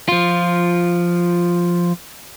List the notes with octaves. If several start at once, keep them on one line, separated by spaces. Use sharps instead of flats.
F3 F4